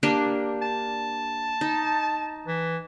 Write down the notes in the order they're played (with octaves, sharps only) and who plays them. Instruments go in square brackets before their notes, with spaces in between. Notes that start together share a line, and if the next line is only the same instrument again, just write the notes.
[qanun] A#3 D4 G4
[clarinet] A5
[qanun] D#4
[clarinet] E3